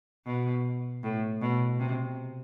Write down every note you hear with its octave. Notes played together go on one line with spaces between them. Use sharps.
B2
A2
B2
C3